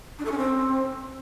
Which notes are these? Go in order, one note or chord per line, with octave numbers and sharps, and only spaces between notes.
D4
A4
C#4
C4